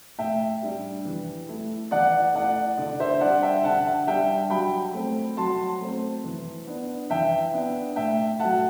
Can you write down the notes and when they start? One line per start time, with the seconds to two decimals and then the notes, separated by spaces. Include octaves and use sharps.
0.19 A2 E5 G5
0.62 G3 D4
1.05 E3
1.48 A3 E4
1.91 E3 D5 F#5
2.34 A3 E4 D5 F#5
2.77 D3 D5
3.00 C5 E5
3.21 G3 D4 D5 F#5
3.43 E5 G5
3.64 D3 F#5 A5
4.07 G3 D4 E5 G5
4.50 F#3 G5 B5
4.93 A3 C4
5.37 F#3 A5 C6
5.81 A3 C4
6.24 E3
6.67 B3 D4
7.10 E3 E5 G5
7.53 B3 D4
7.96 A2 E5 G5
8.39 F#3 A3 F#5 A5